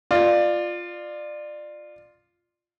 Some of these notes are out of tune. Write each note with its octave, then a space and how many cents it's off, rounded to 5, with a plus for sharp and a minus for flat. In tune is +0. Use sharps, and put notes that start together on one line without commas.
F4 +0 D5 +25